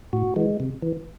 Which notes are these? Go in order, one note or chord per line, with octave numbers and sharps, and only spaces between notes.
A2 F#4
E3 G#3
C3
E3